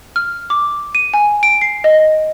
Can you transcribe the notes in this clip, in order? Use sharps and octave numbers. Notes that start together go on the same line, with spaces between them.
F6
D6
D#7
G#5
D7
C7
D#5